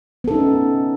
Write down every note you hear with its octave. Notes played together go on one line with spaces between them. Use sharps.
B3 C#4 D#4 A4